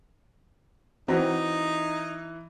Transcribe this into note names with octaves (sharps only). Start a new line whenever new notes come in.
E3 C4 D#4 F#4 A#5